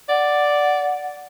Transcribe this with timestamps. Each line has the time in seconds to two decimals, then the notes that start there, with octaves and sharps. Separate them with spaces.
0.09 D5 F#5